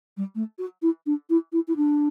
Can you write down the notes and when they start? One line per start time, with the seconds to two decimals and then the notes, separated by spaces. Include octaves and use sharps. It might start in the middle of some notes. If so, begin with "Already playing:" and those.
0.17 G3
0.35 A3
0.58 F#4
0.82 E4
1.06 D4
1.29 E4
1.52 E4
1.67 E4
1.76 D4